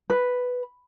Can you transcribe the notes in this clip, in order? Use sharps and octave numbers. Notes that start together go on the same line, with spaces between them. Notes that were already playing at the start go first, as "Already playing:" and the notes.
B4